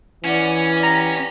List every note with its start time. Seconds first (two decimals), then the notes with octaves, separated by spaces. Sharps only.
0.24 E3 C#4 D5 F#5
0.83 G4 A#5